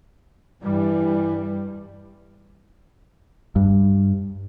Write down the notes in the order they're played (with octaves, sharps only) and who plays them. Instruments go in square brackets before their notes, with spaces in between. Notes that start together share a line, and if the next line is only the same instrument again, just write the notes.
[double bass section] G2 G3 [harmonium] E3
[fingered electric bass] G2